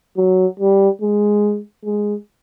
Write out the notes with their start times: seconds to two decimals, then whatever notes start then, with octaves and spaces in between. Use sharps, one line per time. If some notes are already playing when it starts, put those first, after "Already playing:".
0.17 F#3
0.60 G3
1.02 G#3
1.85 G#3